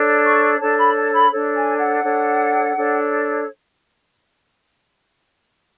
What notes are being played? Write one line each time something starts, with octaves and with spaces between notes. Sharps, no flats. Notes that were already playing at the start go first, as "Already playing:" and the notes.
Already playing: D4 A4 C#5
C#6
D4 A4 C#5 A5
B5
A5
B5
D4 A4 C#5
G#5
F#5
D4 A4 C#5
D4 A4 C#5